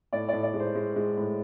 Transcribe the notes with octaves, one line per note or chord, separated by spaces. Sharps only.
A2 D5
A2 D5
D5
G#3
C5
G#3
G#3
A2